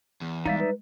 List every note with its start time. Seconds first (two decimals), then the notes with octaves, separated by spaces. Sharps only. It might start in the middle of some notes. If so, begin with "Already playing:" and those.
0.21 E2
0.45 G3 G#3 D#4 D5 E5 F5
0.59 B4